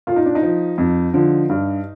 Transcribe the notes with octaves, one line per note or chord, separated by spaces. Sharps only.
A#2 F4
D#4
D4
D#4
F3
F2
D3 F3
G2